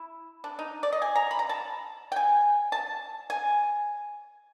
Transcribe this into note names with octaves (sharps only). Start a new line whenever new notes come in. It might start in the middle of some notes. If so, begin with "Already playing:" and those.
Already playing: E4
D4
D#4
D5
D#5
G#5
A#5
B5
A#5
A5
G5
G#5
A5
G#5